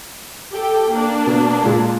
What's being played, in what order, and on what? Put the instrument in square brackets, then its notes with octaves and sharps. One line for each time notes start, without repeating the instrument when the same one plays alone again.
[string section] G4 A4 G5
A#3 D4
[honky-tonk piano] B2
A#2 G#3